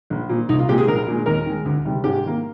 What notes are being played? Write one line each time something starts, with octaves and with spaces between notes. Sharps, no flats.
A#1
A#2 F3
C2 D#4
F4
A#2 G#3 G4
G#4
A#1 A#4
A#2 G#3
D#2 A#4
D#3 G#3
D2
C3 D#3 G3
G#2 G4
D#3 A#3